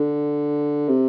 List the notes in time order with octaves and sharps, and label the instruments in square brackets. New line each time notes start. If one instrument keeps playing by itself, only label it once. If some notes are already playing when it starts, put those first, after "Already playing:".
Already playing: [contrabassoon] D3
C3